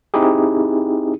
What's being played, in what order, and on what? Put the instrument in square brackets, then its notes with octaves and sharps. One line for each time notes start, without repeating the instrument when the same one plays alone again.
[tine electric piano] C4 D#4 E4 G4 G#4